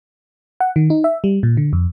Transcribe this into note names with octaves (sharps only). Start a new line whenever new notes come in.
F#5
D#3
D#4
E5
G3
A#2
D3
F2